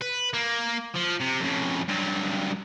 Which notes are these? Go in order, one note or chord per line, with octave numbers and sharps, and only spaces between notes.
B4
A#3
F3
C3
F2 C#3
G2 F#3